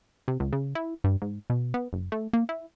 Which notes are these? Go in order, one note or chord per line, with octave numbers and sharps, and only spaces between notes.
C3
C#2
C#3
E4
G2
G#2
B2
B3
F#1
A3
A#3
E4